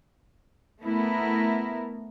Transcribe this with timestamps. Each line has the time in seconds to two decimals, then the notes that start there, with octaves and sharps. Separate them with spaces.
0.83 A3 B3 E4 A#4